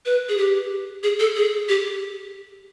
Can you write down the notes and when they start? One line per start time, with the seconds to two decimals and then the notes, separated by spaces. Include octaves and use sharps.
0.06 B4
0.29 G#4
0.38 G4
1.03 G#4
1.20 A4
1.36 G#4
1.69 G4